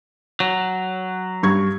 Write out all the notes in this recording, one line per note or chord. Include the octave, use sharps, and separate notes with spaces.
F#3
G2 C#6 G#6